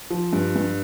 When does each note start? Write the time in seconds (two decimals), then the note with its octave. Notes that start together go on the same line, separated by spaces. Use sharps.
0.10 F3
0.33 G2
0.56 G2